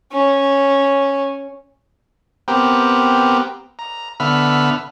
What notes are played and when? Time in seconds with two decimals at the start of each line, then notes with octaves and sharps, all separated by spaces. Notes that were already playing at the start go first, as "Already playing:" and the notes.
0.13 C#4
2.48 B3 C4 G4 A#4
3.79 A#5
4.20 D3 B3 E5 B5 F6